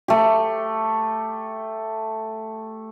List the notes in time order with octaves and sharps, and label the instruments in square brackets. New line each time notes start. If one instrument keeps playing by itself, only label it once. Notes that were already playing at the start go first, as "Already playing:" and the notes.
[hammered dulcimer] A3 G4